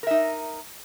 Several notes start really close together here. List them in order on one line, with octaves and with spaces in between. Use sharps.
A#4 E5 D#4